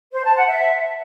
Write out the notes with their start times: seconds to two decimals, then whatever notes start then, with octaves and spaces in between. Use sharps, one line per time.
0.12 C5
0.24 A5
0.36 F#5
0.47 E5